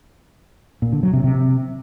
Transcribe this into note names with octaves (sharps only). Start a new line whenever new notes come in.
A#2
D3
F#3
C3
C3